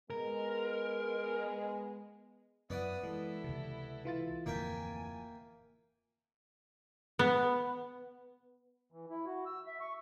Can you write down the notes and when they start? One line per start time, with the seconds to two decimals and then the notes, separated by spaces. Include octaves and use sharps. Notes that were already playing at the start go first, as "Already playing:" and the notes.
0.10 G#3 B3 A#4
2.70 F#2 B3 E4 D5 F#5 D#6
3.03 E3 G#3 E4 A4
3.44 C#2 C3
4.05 E3 F4 A6
4.46 D1 F2 D3 A#3 E5 G5 G#5
7.19 B3
8.92 E3
9.10 E4
9.26 F#4
9.46 E6
9.67 E5
9.81 C#6